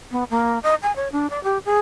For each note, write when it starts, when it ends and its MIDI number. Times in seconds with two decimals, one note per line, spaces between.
0.11 0.24 59
0.30 0.59 58
0.63 0.75 75
0.82 0.94 80
0.96 1.08 73
1.12 1.29 62
1.30 1.42 74
1.44 1.58 67
1.65 1.79 68